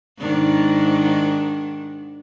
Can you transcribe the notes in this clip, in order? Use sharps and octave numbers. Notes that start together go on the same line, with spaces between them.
G#2 D#3 D4